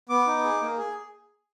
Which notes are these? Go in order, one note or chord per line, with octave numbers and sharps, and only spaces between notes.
B3 D6
D#4
G#4
A#3
G#4